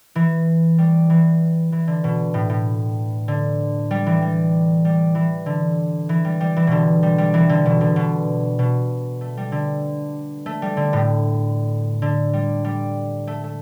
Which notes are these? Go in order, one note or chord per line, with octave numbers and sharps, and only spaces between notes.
E3
G3
E3
E3
D3
B2
A2
A2
D3
G3
E3
G3
G3
E3
D3
E3
G3
G3
E3
B2 D3
G3
G3
E3
D3
B2
D3
B2
B2
A3
G3
D3
A3
G3
D3
A2
D3
G3
G3
A3
A3